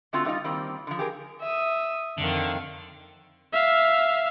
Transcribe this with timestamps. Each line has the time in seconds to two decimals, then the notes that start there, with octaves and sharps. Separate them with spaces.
0.13 D3 A3 C4 F4 F#4
0.25 G3 A3 D#4 F4
0.44 D#3 G3 A#3 C4
0.87 D3 F3
0.99 G4 G#4 A#4
1.41 E5 D#6
2.18 F2 D3 D#3 F5
3.52 E5 F5